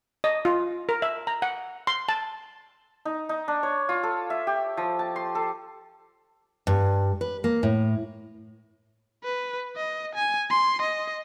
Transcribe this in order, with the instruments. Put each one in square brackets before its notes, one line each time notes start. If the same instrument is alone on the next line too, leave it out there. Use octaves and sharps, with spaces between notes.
[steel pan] D#5
F4
A#4
E5
A#5
F#5
C6
A5
[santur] D#4
D#4
D4
C#5
F4
A4
E5
G4
F3
A5
C6
A4
[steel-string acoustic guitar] G2
B4
A#3
A2
[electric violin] B4
D#5
G#5
C6
D#5